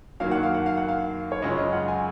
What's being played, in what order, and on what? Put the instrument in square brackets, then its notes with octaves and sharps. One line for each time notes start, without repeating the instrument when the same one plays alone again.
[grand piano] F#2 D#3 F#3 A#3 [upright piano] F5
[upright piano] F#5
F5
F#5
F5
F#5
F5
C#5
[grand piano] F#2 C#3 G#3 C#4 F4 [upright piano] D#5
[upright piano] D#5
F#5
G#5